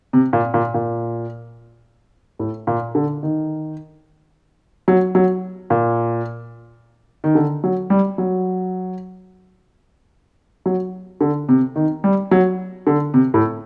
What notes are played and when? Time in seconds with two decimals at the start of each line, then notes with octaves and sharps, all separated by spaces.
0.13 C3
0.33 A#2
0.54 A#2
0.74 A#2
2.39 A2
2.67 A#2
2.95 D3
3.23 D#3
4.88 F#3
5.15 F#3
5.70 A#2
7.24 D#3
7.35 D3
7.64 F#3
7.90 G3
8.18 F#3
10.66 F#3
11.21 D3
11.49 C3
11.76 D#3
12.04 G3
12.31 F#3
12.87 D3
13.14 C3
13.34 A2